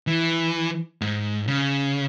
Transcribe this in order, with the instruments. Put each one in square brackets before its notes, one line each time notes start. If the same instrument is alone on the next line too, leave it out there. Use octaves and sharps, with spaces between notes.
[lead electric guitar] E3
G#2
C#3